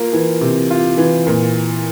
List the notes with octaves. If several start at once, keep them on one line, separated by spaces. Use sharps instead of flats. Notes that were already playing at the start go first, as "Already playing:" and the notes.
Already playing: A#3 F4
E3
C3
F4
E3
A#2